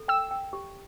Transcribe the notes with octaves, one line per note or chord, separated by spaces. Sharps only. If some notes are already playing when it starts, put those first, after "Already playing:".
Already playing: A4
G5 E6
G5
G4